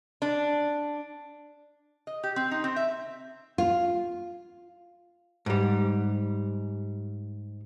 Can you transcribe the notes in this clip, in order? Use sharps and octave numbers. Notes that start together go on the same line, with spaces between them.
D4
D#5
G4
C4
D#4
C4
E5
F4
G#2 G3